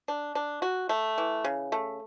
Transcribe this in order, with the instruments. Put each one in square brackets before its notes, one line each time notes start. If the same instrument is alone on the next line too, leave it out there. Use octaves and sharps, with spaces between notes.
[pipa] D4
D4
F#4
A3
E3
C#3
A3